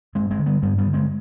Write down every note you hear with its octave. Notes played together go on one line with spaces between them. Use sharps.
G2 G#3 C4
G#3 C4
D3
G3 B3
G2 G3 B3
G3 B3
D3
G#3 C4